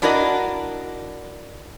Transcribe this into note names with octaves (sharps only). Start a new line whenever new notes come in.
D4 E4 F#4 A#4 D5 D#5